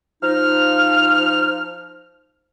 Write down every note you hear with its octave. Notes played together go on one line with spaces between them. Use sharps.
F3 D#4 F6